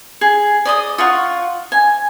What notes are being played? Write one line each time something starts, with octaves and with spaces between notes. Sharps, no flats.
G#4
D5 D#5 D#6
F4 F#5 C#6
G#5